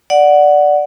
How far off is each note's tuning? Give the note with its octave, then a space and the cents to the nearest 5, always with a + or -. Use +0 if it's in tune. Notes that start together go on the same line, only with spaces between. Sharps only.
D5 +0 F#5 +0